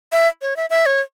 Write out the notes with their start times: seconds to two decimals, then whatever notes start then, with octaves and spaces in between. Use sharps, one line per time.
0.12 E5
0.42 C#5
0.56 E5
0.70 E5
0.86 C#5